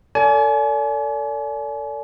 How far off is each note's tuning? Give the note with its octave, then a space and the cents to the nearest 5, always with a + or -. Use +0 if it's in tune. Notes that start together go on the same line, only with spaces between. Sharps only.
A4 +35 D5 -35 G#5 +35